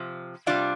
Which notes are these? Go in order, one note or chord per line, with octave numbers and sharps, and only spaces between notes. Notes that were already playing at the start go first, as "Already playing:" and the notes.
Already playing: C3 F3
C3 G3 D4 F4